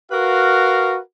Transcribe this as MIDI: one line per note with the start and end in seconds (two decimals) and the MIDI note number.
0.12 0.98 66
0.12 0.98 70
0.12 0.98 71
0.12 0.98 77